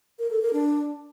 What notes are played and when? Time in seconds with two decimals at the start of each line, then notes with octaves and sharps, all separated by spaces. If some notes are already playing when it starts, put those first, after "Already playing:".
0.19 A#4
0.30 A4
0.42 A#4
0.53 D4